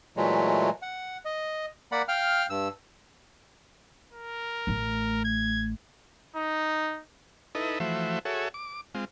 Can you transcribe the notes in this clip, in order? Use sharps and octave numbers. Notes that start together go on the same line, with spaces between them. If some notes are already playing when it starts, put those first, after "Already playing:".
A#2 E3 F#3 G#3 A3
F#5
D#5
A#3 D5 F#5 B5
F5 G5 F6
G2 E6
A#4
A1 A3
G#6
D#4
D#4 E4 A4 B4 D#5
E3 F3 A3 F#4 C5 E5
F#4 G#4 A4 C#5 E5
D6
G#3 C4 F4